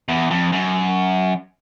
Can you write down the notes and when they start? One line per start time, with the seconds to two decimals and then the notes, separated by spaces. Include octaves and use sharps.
0.08 E2
0.30 F2
0.52 F#2